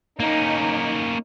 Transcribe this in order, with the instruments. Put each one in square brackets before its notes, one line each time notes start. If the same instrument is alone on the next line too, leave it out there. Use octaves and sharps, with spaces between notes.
[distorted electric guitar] A#3 C#4 [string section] D#4